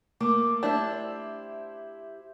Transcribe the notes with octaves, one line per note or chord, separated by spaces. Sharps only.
A3 A#3 D6
D4 E4 G4 C5 E5 A5